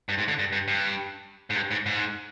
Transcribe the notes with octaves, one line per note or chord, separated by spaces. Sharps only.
G2
G#2
D3
G2
G2
G2
G#2
G2
G#2
G#2